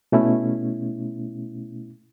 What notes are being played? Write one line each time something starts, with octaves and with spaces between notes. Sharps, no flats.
B2 A3 C#4 E4